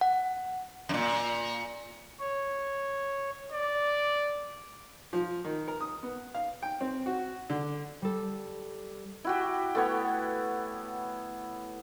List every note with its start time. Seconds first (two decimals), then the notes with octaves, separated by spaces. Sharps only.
0.01 F#5
0.89 F#2 A#2
2.20 C#5
3.53 D5
5.13 F3
5.44 D#3
5.68 A#4
5.81 D#6
6.03 B3
6.35 F5
6.63 G5
6.81 C4
7.06 F#4
7.50 D3
8.02 G3 A4
9.25 E4 F#4 G4
9.75 A3 B3 C#5